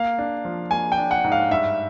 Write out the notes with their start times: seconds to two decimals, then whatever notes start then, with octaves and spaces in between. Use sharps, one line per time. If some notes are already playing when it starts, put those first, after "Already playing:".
Already playing: A#3 F5
0.19 D4
0.45 F3
0.71 A#3 G#5
0.92 G5
0.98 D4
1.11 F#5
1.24 G#2
1.32 F5
1.51 G2 E5